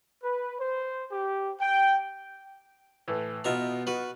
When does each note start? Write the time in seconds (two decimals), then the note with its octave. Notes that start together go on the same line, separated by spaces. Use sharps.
0.23 B4
0.59 C5
1.12 G4
1.61 G5
3.08 A2 E3
3.44 B2 B3 D#4 F4 E5 A#5
3.87 F#4 B4